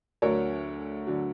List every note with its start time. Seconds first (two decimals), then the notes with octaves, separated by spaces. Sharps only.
0.22 D2 D3 F#3 A#4 C#5
1.07 D3 F#3